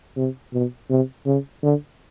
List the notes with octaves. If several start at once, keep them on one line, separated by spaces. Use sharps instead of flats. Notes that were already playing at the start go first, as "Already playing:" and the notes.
C3
B2
C3
C#3
D3